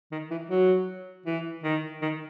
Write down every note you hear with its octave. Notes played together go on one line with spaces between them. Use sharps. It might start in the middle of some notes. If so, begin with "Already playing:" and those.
D#3
E3
F#3
E3
D#3
D#3